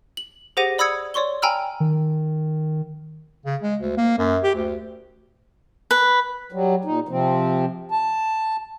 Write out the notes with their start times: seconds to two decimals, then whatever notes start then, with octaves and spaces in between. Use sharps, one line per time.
0.17 F#7
0.57 G4 G#4 C5 F#5 A#6 D#7
0.78 D5 B5 D#6 E6 G#6 C#7
1.14 C#5 D5 C6 C#6 G7
1.42 G5 G#5 A#5 B5 E6 F6
1.80 D#3
3.45 C#3
3.63 G#3
3.80 D2
3.97 A#3
4.18 F#2
4.44 G4
4.55 D2
5.91 B4
6.52 F#3 G3
6.85 A#2 D#4
7.09 C3 F3 C4
7.91 A5